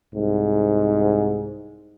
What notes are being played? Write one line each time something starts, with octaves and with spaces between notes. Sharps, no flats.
C2 G#2